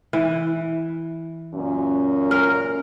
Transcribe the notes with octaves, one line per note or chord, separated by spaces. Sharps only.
E3
F#2 A#2 C#4
A#4